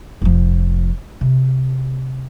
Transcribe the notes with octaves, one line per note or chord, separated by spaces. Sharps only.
F1 F3
C3